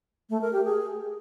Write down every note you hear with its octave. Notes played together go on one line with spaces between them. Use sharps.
A3
A#4
G4
G#4